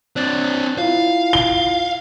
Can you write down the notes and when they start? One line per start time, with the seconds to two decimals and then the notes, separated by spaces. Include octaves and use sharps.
0.16 C4 D4 F#6 A6
0.78 E4 F4 F5
1.33 G7